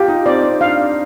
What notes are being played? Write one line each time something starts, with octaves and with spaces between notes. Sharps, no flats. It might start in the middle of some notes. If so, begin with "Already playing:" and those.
Already playing: F4 G4
D#4
C4 D5
C4
D4 F5